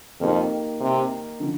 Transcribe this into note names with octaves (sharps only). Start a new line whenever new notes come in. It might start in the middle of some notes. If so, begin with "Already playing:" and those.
F2 D#3 A#3 D#4 G4
C3
D3 F3